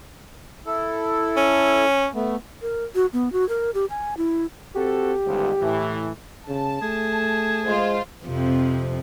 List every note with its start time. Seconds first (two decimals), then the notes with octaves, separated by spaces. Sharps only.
0.66 E4 A4
1.37 C#4
2.15 A3 B3
2.62 A#4
2.95 F#4
3.13 B3
3.33 F#4
3.49 A#4
3.74 G4
3.90 G#5
4.17 E4
4.75 C4 F#4 G4 A4
5.26 G1 C#2 G#2
5.61 A2 E3
6.48 C#3 A5
6.82 A3 G#4
7.67 G#3 F4 C5
8.25 F2 C3 F3